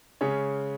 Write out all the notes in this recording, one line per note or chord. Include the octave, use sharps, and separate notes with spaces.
C#3 G#3 C#4 C#5